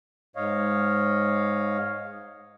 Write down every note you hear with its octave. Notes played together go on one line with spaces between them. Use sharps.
G#2 C#5 D#5 F5